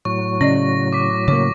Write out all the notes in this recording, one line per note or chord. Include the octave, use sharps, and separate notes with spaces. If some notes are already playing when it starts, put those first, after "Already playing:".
A2 F#3 C#6
C#3 C#4 D5 D#5 A#6
D6 B6
C#3 A#3 C#5 D6